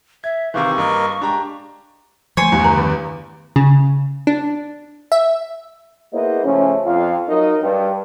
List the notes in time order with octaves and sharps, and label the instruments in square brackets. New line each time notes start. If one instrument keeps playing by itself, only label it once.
[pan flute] E5 [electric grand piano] G#6
[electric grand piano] C3 D#3 E3 [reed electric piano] G#4 F5 D6 [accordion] C5 [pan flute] C#6
[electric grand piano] G2 [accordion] A#3 A#4 D#5
[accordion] G#3 [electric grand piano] D4 G4 A#5
[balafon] E3 [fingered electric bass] F3 A3 [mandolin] C#5 G#5 C6
[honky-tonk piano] E2 G2
[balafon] D3 A#5
D#3
[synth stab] C#3
D4
E5
[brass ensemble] A#3 B3 E4 G#4 C5 D#5
C#3 F3 A3 C#4
F2 F4 F5
F#3 D#4 A#4 D#5
G2